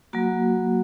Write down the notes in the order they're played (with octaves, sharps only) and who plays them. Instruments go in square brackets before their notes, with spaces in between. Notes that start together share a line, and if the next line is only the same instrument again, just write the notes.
[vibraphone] F#3 A#3 F#4